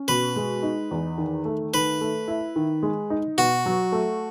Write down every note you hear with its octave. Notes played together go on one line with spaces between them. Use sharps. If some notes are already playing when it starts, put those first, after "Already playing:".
Already playing: C#4
B2 B4
G#3
D#4
E2
D#3
A3
D#3 B4
A3
E4
D#3
G#3
D#4
B2 F#4
F#3
A3